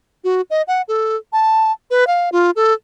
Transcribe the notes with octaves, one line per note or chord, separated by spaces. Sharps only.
F#4
D#5
F#5
A4
A5
B4
F5
F4
A4